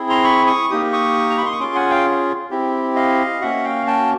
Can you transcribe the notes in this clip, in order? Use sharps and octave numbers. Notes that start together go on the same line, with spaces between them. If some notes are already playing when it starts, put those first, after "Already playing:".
Already playing: C4 E4 G#4
A#5 C6
B5 C#6
C#6 D#6
A#3 D#4 G4 D#6
C#6 D#6
A#5
B5
C6
C#6
C#4 F4 G#4 C6 D6
F#5 G#5
F5 G5
C4 E4 G4
D#5 F5
A#3 C#4 F#4 E5 F#5
F5 G5
G5 A5